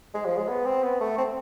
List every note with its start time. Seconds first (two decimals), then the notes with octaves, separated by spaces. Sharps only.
0.14 G#3
0.25 F3
0.37 G#3
0.48 B3
0.65 C4
0.83 B3
1.00 A3
1.18 C4